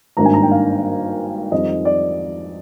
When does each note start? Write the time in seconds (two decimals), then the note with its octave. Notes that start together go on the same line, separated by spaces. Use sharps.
0.17 G#1 G2 D#3 A#3 D4 A#5
0.26 G#5
0.34 A#5
0.43 G5
0.52 F5
1.52 F2 D#3 G3 C4 D#5
1.85 D5